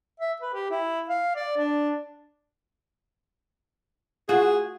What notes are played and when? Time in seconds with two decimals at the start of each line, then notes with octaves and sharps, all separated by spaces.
0.20 E5
0.42 B4
0.54 G4
0.71 E4
1.09 F5
1.36 D5
1.57 D4
4.29 F4 F#4 G#4